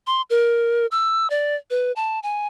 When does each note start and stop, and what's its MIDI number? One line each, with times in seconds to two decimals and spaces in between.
0.07 0.22 84
0.30 0.87 70
0.91 1.30 88
1.30 1.56 74
1.70 1.92 71
1.96 2.19 81
2.23 2.47 80